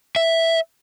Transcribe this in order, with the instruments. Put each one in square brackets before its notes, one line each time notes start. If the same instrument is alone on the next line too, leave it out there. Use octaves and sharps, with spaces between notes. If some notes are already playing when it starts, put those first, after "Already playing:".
[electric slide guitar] E5